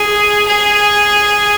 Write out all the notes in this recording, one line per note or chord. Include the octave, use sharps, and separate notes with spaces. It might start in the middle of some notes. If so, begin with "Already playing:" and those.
Already playing: G#4
G#4